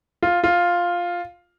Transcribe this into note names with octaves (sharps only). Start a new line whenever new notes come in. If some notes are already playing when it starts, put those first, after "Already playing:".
F4
F4